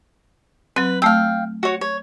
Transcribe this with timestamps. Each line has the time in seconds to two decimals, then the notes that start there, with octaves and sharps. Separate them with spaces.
0.76 F#3 C4 B4
1.02 A3 F5 G5 E6
1.63 F#4 C#5
1.81 C#5